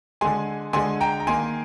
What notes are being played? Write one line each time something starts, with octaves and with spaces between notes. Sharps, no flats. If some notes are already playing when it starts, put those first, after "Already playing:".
D3 G#3 G#5 C6
D3 G#3 G#5 C6
G5 A#5
A#5
D#3 A#3 G#5 C6